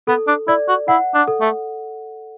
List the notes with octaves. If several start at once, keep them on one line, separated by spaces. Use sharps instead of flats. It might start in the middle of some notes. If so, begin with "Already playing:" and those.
B3 A4
D4
E4 D5
F#4
E4 F#5
D4
A4
A3